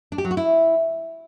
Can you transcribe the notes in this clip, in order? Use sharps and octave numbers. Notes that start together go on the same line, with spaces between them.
D4
G4
F#3
F#4
E4